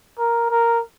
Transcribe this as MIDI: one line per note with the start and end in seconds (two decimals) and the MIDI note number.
0.19 0.48 70
0.50 0.81 70